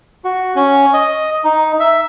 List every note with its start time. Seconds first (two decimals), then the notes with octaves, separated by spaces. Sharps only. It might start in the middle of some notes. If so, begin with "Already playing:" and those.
0.25 F#4
0.56 C#4
0.94 D#5
1.44 D#4
1.80 E5